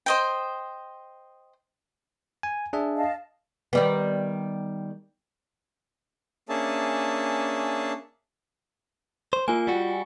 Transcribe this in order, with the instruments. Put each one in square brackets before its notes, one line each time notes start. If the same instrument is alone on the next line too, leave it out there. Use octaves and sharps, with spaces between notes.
[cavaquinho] C5 D#5 G5
[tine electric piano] G#5
D4 G#4 E5
[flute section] D#5 F5 A5
[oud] D#3 G3 B3
[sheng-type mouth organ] A#3 C#4 D4 G#4 E5 A5
[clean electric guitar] C5
[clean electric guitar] A#3 [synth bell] F4 G#5
[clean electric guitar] G3 F#4